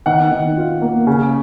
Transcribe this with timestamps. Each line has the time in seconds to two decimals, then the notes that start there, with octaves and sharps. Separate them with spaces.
0.06 D#3 F#5
0.31 D#3
0.57 F4
0.82 A#3
1.07 C#3